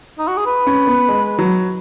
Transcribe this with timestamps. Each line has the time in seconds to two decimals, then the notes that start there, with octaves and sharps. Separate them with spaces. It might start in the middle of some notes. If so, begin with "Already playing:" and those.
0.19 D#4
0.28 F#4
0.37 G#4
0.46 B4
0.67 C#4
0.87 B3
1.09 G#3
1.39 F#3